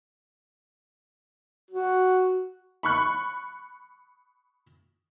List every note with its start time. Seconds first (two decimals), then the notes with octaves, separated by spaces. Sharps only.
1.71 F#4
2.83 B5 C#6 F#6